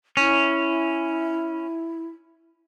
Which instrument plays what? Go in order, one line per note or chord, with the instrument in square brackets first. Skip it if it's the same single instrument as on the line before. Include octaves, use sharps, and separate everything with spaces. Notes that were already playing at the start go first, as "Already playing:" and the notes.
[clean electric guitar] C#4 [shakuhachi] E4